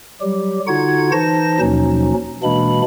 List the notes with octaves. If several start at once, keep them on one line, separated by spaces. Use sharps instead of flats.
F#3 G3 G4
D3 D#4 F4 F#4 F#5 G#6
E3 D#4 C5 A5 A#6
D#2 B2 F3 F#3 C#4 D#4
B2 E3 G#3 A#3 D4 B5